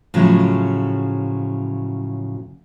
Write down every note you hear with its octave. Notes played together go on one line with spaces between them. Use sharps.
A2 C#3 F3 F#3